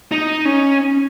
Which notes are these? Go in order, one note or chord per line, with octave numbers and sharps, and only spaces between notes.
D#4
C#4